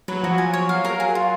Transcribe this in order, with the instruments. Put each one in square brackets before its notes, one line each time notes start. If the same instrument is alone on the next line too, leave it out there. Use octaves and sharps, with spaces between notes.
[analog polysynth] F#3 [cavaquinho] B4
[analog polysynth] F3 [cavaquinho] F#4
[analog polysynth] F#3 [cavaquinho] G#5
[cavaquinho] C#5
[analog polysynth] F#3 [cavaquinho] F5
[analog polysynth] F#3 [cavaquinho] A#4
[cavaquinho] G#4
F4